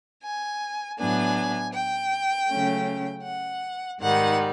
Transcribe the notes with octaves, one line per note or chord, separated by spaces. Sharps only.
G#5
A2 F#3 B3 D4 G#5
G5
C#3 F#3 A3 C#4
F#5
G#2 D#3 G3 F#5